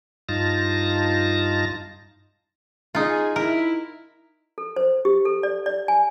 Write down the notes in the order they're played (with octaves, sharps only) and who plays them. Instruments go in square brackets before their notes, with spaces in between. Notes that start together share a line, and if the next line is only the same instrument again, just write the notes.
[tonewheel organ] G2 D#4 F4 A5 A#6
[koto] D#4 F4 [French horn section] G#4
[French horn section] E4 [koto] A#4
[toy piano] A4
C5
G4
A4
D5
D5
G#5